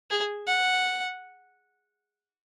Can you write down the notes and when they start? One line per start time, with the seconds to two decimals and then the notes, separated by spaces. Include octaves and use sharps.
0.11 G#4
0.47 F#5